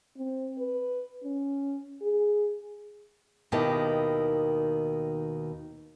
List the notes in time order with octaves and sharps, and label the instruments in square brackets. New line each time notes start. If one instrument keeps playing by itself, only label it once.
[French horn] C4
B4
C#4
G#4
[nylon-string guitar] D#2 B2 D#3 E4 G4 A5